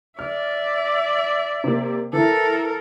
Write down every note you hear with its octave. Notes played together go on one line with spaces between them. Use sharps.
D5 E5 F6
C3 A#3
E3 E4 A4 A#4